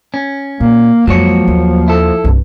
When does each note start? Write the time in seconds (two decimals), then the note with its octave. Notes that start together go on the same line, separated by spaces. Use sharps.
0.14 C#4
0.60 A#2 A#3
1.07 F2 F3 F#3 G#3 A#3 C#5
1.48 D#2
1.88 E4 A4
2.24 C2 G2